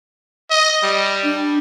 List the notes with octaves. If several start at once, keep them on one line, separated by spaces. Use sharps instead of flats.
D#5
G3
D4